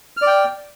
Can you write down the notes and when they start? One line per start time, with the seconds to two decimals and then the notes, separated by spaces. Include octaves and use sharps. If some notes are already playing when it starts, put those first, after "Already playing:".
0.17 F6
0.22 D5
0.27 G5